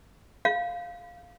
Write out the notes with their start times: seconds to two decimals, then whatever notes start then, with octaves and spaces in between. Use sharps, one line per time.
0.45 F5